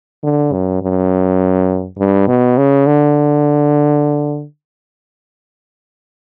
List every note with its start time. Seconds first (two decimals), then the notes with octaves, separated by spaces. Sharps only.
0.23 D3
0.53 F#2
0.82 F#2
1.99 G2
2.28 B2
2.57 C#3
2.87 D3